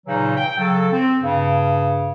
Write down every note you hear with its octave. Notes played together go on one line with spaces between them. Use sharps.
A#2 C#3 E3 F#3 D#4
G5
C#3 F#3 A4
C4
G2 C#3